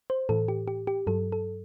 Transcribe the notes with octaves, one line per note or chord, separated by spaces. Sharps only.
C5
A2 E3 A4
G4
G4
G4
G2 F#3 A4
A4